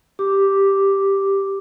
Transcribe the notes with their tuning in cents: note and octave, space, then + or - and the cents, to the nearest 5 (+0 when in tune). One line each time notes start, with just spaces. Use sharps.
G4 +0 D6 +0